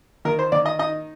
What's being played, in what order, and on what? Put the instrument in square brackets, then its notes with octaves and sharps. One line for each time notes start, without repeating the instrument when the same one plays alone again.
[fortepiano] D#3 A#4
C5
D#3 D5
D#5
D#4 D#5